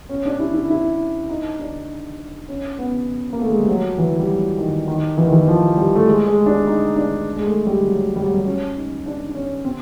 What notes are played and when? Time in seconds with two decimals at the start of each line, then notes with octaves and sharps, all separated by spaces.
0.09 C#4
0.26 D4
0.40 E4
0.54 E4
0.70 E4
1.29 D#4
1.59 D4
2.49 C#4
2.79 B3
3.33 A#3
3.42 A3
3.50 G#3
3.60 G3
3.69 F#3
3.98 E3
4.19 G3
4.28 F#3
4.58 D#3
4.88 D#3
5.17 E3
5.25 D#3
5.32 E3
5.48 F3
5.77 G3
5.95 A3
6.07 G#3
6.28 G#3
6.46 D4
6.67 D#4
6.97 D4
7.36 G#3
7.46 A3
7.67 G3
7.86 F#3
8.16 G3
8.25 F#3
8.34 G3
8.46 C#4
8.75 D#4
9.06 D4
9.27 D4
9.35 C#4
9.65 C4